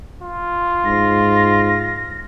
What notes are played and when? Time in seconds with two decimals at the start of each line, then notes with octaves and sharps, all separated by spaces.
0.23 F4
0.85 G#2 A#6